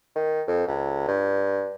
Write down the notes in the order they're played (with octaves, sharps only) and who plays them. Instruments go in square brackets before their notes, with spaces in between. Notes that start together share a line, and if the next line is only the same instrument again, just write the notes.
[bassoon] D#3
F2
C#2
G2